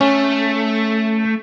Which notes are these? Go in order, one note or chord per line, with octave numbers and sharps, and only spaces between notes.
A3 C#4